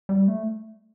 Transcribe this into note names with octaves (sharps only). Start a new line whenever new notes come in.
G3
A3